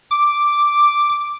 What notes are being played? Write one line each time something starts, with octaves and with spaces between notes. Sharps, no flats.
D6